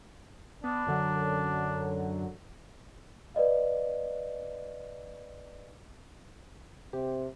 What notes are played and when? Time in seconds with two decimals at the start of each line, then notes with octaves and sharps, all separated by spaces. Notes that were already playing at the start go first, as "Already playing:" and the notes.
0.64 B3 D4
0.87 F#2 D3 F#3
3.35 B4 D5 D#5 F5
6.93 C3 G4